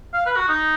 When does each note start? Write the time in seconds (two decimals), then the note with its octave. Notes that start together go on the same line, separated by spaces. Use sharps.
0.14 F5
0.26 B4
0.37 F#4
0.48 D#4